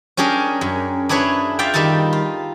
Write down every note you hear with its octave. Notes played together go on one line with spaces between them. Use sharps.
C#4 D4 G4 G#4 A#4
F#2
D4 E4 G#4 B4 C#5
F4 D5 E5 F5 G5
D#3 G3 D#4 A4 A5
F4